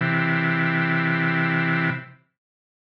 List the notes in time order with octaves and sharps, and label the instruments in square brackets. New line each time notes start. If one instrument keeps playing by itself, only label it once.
[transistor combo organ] C3 E3